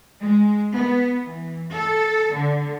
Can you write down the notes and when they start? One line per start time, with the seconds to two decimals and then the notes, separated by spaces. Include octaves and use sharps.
0.21 G#3
0.73 B3
1.22 E3
1.71 A4
2.33 D3